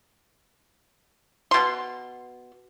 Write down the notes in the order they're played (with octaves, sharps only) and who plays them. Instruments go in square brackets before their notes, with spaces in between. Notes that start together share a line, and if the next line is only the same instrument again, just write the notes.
[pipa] B2 C6